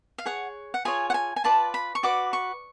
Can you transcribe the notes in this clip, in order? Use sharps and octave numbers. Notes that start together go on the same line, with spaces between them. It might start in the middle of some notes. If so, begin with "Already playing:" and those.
F5
G#4 C#5 F#5
F#5
F4 G#4 C#5 G#5
F#5
G#5
G#5
F4 B4 D5 A5
B5
C#6
F#4 B4 D5 D6
C#6